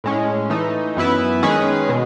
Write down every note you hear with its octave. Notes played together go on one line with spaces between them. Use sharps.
A2 G#3 C#4
E3 A3 D#4
F#2 E3 B3 E4 B4
D#3 G#3 C#4 G#4 B4
B2 G#3